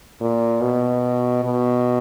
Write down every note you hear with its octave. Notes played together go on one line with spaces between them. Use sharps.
A#2
B2
B2